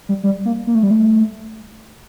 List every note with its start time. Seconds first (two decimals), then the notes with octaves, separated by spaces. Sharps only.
0.09 G3
0.23 G3
0.45 A#3
0.67 A#3
0.75 A3
0.83 G3
0.91 A3